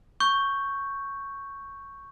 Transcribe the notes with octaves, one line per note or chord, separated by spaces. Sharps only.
C#6 G6